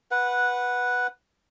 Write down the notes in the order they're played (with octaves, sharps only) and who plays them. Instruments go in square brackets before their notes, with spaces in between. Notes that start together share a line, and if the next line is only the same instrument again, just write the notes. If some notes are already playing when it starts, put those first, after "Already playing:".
[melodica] B4 F#5